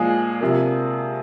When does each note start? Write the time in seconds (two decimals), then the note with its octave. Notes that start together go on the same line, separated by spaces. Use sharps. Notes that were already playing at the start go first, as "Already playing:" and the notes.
Already playing: A#2 F3 G#3 G#4
0.41 C3 F3 A#3